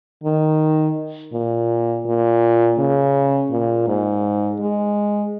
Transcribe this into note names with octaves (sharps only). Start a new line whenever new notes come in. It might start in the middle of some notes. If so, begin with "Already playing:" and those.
D#3
A#2
A#2
C#3
A#2
G#2
G#3